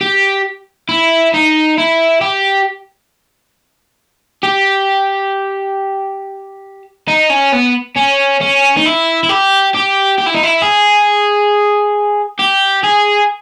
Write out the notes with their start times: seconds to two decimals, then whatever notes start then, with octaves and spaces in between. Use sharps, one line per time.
0.01 G4
0.89 E4
1.34 D#4
1.78 E4
2.21 G4
4.43 G4
7.08 D#4
7.30 C#4
7.53 B3
7.97 C#4
8.41 C#4
8.77 D#4
8.86 E4
9.23 E4
9.29 G4
9.75 G4
10.18 G4
10.26 E4
10.35 D#4
10.43 E4
10.62 G#4
12.39 G4
12.83 G#4